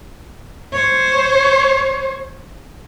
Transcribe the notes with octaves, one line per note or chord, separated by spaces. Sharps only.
C5 C#5